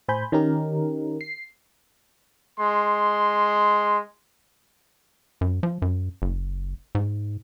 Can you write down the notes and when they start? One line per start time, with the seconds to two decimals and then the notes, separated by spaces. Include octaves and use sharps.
0.08 A2 C5 G#5 B5 G6
0.32 D#3 C#4 D#4 G4 A#4
1.21 C7
2.59 G#3 C6
5.41 F#2
5.63 F3
5.82 F#2
6.22 F#1
6.95 G#2